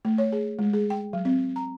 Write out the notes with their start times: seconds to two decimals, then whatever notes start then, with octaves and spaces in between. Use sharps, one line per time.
0.05 A3
0.18 C#5
0.32 G#4
0.59 G#3
0.73 G#4
0.90 G5
1.13 F#3
1.25 C4
1.56 A#5